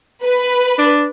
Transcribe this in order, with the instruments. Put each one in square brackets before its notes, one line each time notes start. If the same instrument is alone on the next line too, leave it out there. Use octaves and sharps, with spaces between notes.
[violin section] B4
[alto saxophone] D4